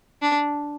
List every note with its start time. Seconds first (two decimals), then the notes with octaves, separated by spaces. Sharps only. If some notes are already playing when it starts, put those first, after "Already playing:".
0.22 D4